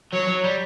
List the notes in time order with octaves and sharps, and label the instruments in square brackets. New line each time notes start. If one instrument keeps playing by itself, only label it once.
[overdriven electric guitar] F#3 [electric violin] C#5
[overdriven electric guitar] F#3
G3